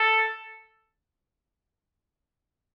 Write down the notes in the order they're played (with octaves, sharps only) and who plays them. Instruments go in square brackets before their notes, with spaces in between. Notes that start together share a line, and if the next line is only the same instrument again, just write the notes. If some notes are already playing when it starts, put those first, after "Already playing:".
Already playing: [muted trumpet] A4